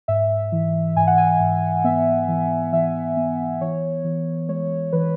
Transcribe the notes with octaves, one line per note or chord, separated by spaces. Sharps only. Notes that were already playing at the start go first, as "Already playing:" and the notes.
G#2 E5
E3
G#2 G#5
F#5
G#5
G#2
B3 E5
E3
E3 E5
B3
E3 C#5
E3
G#3 C#5
E3 B4